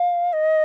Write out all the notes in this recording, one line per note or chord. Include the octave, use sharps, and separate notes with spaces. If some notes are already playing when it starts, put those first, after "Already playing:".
Already playing: F5
D#5